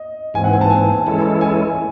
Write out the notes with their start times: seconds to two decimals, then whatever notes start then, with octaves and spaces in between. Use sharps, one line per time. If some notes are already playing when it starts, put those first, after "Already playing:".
Already playing: D#5
0.34 G#2 E3 C4 G#5
0.44 F#5
0.53 G#5
0.61 A5
0.70 G#5
1.06 E3 G#3 C#4 E4 A4
1.41 G#5